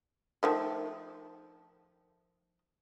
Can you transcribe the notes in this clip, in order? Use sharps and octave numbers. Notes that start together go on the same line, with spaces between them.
D#3 F3 A3